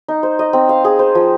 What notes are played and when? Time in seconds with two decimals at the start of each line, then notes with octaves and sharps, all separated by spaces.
0.08 D#4
0.23 C5
0.39 D#5
0.53 C4
0.69 F5
0.85 G#4
0.99 C5
1.15 F3